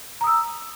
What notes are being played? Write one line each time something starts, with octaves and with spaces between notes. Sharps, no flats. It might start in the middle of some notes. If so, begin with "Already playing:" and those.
A#5 D#6 E6